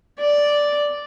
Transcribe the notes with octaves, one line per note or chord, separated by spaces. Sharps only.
D5